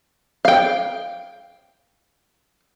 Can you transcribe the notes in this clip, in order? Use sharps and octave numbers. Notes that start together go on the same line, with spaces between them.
F5 G5